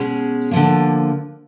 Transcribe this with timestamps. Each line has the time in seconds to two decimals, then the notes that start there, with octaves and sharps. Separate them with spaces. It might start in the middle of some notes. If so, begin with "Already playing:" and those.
Already playing: B2 G#3 C#4 G#4
0.51 D3 F3 A#3